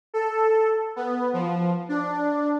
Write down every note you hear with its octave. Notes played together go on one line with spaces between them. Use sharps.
A4
B3
F3
D4